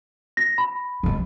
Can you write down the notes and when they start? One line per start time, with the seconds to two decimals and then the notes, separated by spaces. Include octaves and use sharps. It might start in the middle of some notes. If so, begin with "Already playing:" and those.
0.37 A#6
0.58 B5
1.03 E3 G#3